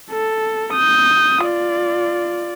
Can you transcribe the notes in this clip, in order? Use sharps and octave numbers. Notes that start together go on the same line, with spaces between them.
A4
D#6 G6
F4 D5